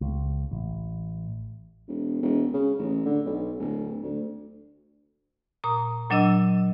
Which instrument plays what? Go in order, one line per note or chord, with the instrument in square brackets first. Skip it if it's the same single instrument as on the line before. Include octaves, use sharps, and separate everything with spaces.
[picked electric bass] C#2
A1
[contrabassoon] E1
E1
C#3
A1
D3
B1
D1
D2
[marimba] A#2 A#5 D#6
A#2 F#3 D4 D#5 E6